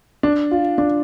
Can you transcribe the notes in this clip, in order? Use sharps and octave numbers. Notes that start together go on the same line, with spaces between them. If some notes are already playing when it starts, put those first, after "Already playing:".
D4
F4
D4